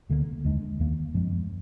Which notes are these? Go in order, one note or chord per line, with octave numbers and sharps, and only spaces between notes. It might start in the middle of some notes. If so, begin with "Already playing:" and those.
D2 D3 F#3 A#3
D#2 D3 G#3 D4
D#2 D#3 A#3
F#2 F3 G#3 B3